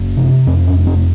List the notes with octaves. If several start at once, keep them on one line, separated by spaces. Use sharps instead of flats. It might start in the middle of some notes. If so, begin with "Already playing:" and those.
Already playing: F#1
C3
F2 C4
C#4
F1
C4